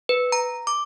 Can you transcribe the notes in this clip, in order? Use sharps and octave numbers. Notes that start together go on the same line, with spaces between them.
B4
A#5
D6